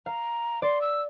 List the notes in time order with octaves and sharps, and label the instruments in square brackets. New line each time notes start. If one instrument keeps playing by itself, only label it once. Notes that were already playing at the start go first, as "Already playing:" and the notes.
[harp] F5 [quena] A#5
[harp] D5 [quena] C6
[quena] E6